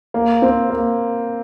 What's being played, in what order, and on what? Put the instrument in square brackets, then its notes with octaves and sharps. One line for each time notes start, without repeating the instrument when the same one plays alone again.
[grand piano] A#3
C4
A#3